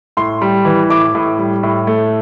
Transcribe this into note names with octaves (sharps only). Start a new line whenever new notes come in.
A2 C6
G3
E3
A2 D6
A2
G3
A2
A3